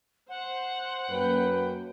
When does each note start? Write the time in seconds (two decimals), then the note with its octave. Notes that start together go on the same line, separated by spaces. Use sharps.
0.29 C5 F#5
1.09 F#2 A#3 B4 G5